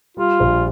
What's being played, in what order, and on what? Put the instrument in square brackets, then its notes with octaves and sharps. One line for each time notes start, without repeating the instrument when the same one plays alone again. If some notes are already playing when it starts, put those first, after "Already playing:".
[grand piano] G3 [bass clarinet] F4
[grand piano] A#1